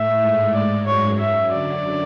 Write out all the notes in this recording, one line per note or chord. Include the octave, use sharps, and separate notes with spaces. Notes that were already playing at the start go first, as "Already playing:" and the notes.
Already playing: A2 A3 E5
G#2 G#3
D5
F#2 F#3 C#5
E5
D3 D5